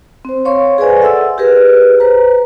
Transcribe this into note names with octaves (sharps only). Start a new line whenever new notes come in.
C4 C5
C#5 F5 C6 C#6
G#4 B4 C5 D5 G#5
A4 E5 F#5 C6 E6
G4 G#4 A#4 B4
B4 C5 A#5